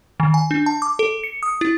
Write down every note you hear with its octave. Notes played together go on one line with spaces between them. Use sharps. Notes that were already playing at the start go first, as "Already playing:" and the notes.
D#3
G#5
D4
A5
D6
A4
C#7
D#6
E4